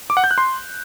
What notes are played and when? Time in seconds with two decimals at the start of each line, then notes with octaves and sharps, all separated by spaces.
0.10 D6
0.17 F#5
0.24 G6
0.31 F#6
0.38 C6